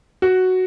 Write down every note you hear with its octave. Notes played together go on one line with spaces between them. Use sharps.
F#4